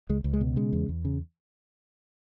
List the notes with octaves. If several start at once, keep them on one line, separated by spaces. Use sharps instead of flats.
C#2 G#3
C#2
G#3
B2
C#3 G#3
E2
E2
C#3